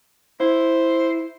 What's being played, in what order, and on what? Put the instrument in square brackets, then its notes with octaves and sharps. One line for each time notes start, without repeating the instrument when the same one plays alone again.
[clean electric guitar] E4 [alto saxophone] C5